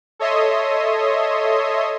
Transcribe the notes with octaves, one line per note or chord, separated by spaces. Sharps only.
A4 C#5 D#5 E5 C6 D#6